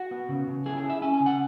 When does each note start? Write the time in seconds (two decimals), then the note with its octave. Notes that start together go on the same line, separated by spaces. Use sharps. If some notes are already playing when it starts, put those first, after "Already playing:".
Already playing: F#4
0.11 B3
0.29 C#3
0.47 C#3
0.66 E4 G#4
0.77 G#4
0.84 E4
0.90 E5
1.02 C#4 G#5
1.14 G#5
1.20 C#3
1.26 F#5